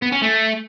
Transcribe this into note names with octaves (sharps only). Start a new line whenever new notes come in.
B3
C#4
A3